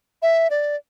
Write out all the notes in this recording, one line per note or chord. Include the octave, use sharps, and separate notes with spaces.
E5
D5